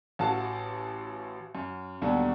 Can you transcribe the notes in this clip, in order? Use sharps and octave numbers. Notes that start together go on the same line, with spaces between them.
A1 F#4 A4 F5 A5
F#2
D#2 B2 D3 F#3 G3